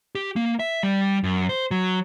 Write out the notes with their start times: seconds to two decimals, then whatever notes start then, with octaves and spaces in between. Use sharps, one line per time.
0.15 G4
0.36 A#3
0.59 E5
0.83 G3
1.24 F#2
1.49 C5
1.71 F#3